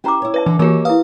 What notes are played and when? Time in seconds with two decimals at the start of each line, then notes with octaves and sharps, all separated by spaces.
0.04 C#4 E4 G4 C5 A#5 D6
0.22 E4 C#5
0.34 B4 D5 E5 A5
0.46 D3 E3
0.59 E3 A#3 D#4 F#4 G4 A#4 C#5
0.85 E4 B4 F5 D#6